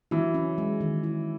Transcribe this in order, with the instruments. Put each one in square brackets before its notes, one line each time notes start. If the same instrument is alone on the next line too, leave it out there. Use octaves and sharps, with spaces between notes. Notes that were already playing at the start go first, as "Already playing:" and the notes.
[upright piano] E3 F#3 [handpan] E4
[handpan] C#4
G#3
D#3
E4